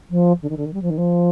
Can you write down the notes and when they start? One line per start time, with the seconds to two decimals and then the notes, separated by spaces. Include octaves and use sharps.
0.10 F3
0.42 D3
0.49 D#3
0.57 D3
0.65 D#3
0.73 G3
0.82 F3
0.90 D#3
0.98 F3